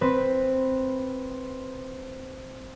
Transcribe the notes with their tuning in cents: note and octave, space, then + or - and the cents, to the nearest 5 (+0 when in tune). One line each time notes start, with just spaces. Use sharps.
C4 +0 B4 +0